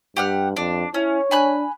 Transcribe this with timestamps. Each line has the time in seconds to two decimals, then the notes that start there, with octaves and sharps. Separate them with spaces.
0.17 G2 G4 F#5 F6
0.57 F2 D4
0.94 C#4 E4 C#5
1.31 D4 G#5 B5 F#6